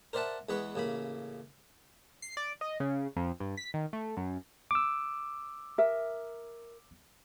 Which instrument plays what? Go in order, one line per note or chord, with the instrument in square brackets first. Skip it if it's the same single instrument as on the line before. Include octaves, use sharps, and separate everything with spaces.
[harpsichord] A#4 C5 D5 E5 F#5 A5
E2 G#3 B3 B4 C#6
A1 C#3 A#3 B5
[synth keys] C7
D5
D#5
C#3
F2
G2
B6
D#3
A3
F#2
[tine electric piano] D6 E6
[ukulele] A#4 E5